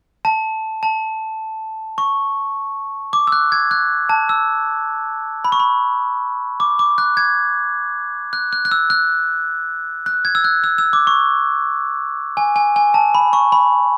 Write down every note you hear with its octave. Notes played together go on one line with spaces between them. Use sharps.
A5
A5
C#6
D6
E6
F#6
G#6
F#6
A5
E6
B5
C#6
B5
D6
D6
F#6
G#6
F#6
F#6
F#6
E6
F#6
F#6
G#6
E6
F#6
E6
E6
D6
C#6
G#5
G#5
G#5
A5
B5
C#6
B5